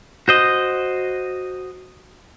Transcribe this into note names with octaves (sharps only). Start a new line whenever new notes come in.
F#4 C5 D#5